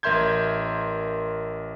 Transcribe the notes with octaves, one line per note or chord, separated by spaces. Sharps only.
A1 A#4 E5 C6 G6 G#6